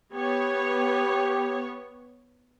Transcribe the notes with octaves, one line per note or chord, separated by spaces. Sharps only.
B3 G4 C#5